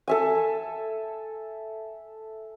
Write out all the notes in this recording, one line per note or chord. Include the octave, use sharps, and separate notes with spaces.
A4 E5 G#5